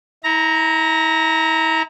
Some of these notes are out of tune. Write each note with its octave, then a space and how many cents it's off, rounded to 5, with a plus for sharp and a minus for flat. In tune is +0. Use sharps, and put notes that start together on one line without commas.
E4 -35 A#5 +0